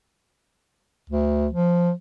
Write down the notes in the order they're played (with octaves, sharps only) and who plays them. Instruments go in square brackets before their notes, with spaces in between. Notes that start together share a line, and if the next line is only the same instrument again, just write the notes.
[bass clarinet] D2
F3